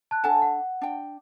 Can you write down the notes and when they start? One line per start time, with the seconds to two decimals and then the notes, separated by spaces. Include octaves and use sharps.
0.11 A5 F#6
0.24 D4 A4 F#5 G#5 A5
0.42 F#5
0.82 D4 G5